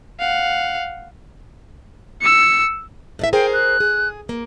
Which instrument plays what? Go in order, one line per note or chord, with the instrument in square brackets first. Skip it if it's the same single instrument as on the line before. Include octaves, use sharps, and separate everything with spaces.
[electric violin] F5 F#5
E6 C#7
[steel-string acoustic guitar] A2 D5 E5
[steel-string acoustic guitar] G#4 A#4 C5 [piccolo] G5
[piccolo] F#6
[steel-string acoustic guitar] G#4
A#3